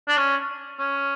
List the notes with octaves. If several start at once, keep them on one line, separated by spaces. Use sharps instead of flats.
D4
C#4
C#4